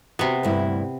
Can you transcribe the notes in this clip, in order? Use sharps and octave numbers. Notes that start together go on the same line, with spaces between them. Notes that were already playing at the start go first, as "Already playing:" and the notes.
C3 B3 F#4
D2 G2 E4